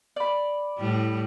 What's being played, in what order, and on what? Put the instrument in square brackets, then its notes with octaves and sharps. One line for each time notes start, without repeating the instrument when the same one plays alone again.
[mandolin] D5 B5
[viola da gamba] A2 G3